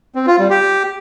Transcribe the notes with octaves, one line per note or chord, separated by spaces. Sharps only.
C4
F4
G3
G4